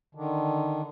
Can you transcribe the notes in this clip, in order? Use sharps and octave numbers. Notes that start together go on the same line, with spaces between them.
D3 D#3